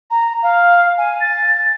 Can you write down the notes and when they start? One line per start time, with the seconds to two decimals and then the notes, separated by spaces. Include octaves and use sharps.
0.11 A#5
0.43 F5
0.98 G#5
1.21 A6